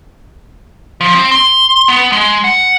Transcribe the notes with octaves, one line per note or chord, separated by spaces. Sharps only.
F3
C4
C6
B3
G#3
F#5